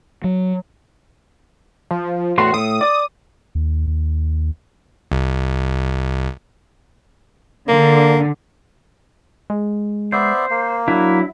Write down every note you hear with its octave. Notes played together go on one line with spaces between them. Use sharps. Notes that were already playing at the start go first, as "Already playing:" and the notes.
F#3
F3
E2 A2 F#4 C6
A2 D#6
D5
D#2
D#2
C2
D3 A#3
G#3
B3 C5 D5 E5
A#3
F#3 D4 E4